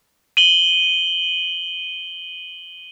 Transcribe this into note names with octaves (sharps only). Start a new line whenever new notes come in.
D#7 F#7 G7